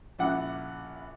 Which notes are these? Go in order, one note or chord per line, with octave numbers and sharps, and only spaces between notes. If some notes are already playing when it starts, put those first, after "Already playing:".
A#1 C#3 E4 F#5 D6